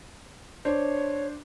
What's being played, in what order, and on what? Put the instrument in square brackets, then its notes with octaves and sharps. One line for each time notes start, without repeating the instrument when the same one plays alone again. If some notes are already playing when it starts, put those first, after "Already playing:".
[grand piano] D4 C5 [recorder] C#5